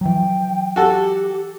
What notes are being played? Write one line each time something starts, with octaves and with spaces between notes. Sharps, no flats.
E3 F#3 G5
F#4 G4 A4